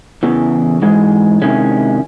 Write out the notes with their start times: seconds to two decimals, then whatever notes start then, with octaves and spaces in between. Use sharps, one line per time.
0.23 E2 C#3 E3
0.82 G#2 E3 G#3
1.41 C3 D#3 G#3 C#4 E4